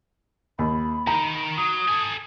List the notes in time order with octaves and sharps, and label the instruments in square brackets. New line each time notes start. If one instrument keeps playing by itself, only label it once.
[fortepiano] D#2 [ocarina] B5
[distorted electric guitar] D#3 [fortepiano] A#5
[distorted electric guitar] F#3 [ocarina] D#6
[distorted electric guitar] A4 G#5